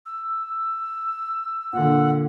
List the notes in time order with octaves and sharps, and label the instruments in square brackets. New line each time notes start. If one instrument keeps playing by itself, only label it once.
[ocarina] E6
[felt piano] A#2 D3 [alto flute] F#5